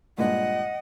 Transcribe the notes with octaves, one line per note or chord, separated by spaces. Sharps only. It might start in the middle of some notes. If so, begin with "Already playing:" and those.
G2 A#2 G#3 D#5 F#5